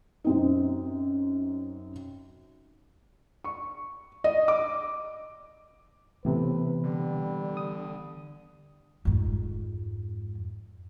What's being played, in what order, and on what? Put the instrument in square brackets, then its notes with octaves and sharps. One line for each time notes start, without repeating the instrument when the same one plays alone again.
[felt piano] F#2 C4 D#4
C#6
D#5
D6
[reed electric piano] A2 C3 [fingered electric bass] E3 B3 [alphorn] B4
[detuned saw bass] D3 [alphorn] G3
[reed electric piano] D#6
[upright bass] F2 G#2